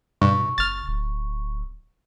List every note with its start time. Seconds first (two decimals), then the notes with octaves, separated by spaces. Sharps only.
0.21 G2 B2 C#6
0.58 F#1 F6 A6
0.87 D1